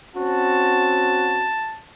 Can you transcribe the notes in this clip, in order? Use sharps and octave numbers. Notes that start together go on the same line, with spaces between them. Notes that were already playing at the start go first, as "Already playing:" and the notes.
C4 C#4 F#4 A5